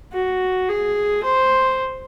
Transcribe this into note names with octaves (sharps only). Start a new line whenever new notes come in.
F#4
G#4
C5